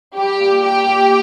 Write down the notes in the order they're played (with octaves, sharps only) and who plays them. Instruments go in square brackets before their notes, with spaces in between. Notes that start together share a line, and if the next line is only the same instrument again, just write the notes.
[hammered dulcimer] G3 [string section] G4
[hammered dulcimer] A#2
[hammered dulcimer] A#3 [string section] G4
[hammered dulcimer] A#2